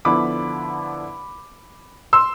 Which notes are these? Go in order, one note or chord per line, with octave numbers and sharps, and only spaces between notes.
D3 F3 B3 E4 B5 D6
C6 E6